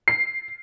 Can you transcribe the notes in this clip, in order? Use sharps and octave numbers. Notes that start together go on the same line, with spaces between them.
C7